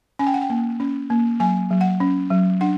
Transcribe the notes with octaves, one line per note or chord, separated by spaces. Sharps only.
C#4 G#5
G5
F#5
G5
A#3
C#4
A#3
F#3 G#5
F#3
F#5
C#4
F#3
D4 F#5